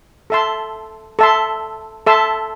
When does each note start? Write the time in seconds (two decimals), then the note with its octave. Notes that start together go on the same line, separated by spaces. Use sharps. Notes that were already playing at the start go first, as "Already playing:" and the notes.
0.30 A4 E5 A5 C6
1.19 A4 E5 A5 C6
2.06 A4 E5 A5 C6